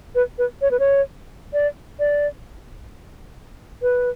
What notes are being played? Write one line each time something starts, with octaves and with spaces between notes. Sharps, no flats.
B4
B4
C#5
B4
C#5
D5
D5
B4